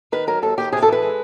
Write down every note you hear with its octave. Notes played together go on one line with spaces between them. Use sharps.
D#3 B4
F#3 A#4
D#2 A4
D#2 G4
C3 G#4
A4
E3 B4
G#3